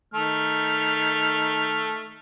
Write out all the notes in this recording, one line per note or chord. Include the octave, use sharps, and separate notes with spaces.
D#3 A3 F6